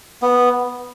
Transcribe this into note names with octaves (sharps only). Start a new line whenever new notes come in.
B3